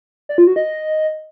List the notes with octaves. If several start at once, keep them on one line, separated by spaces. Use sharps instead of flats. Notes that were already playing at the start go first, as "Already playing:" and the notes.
D5
F4
F#4
D#5